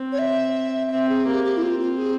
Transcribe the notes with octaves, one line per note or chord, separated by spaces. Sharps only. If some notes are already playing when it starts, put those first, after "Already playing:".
Already playing: C4
C#5
E5
C4 E5
G#4
A#3 G4
G4
E4
C4 F4
F4
G#4